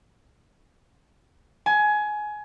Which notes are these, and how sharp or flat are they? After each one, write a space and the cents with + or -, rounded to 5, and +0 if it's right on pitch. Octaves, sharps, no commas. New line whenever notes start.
G#5 +20